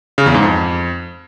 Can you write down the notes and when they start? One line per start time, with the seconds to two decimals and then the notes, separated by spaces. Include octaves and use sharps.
0.18 C#3
0.26 E2
0.34 G#2
0.43 F2